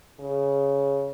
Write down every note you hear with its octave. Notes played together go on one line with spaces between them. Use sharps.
C#3